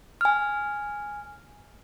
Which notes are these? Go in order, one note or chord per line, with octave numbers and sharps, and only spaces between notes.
G#5 F6